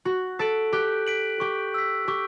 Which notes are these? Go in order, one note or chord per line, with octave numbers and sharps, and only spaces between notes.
F#4 F#6
A4 B6 D7 F#7
G4 F#6
B6 D7 F#7
G4 C#6
E6 B6
G4 C#6